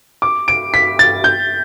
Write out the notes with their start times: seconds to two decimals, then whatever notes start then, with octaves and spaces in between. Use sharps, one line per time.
0.22 D6
0.48 D7
0.74 B6
0.99 A6
1.24 G6